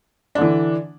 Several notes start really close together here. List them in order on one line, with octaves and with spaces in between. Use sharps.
D4 D3 E3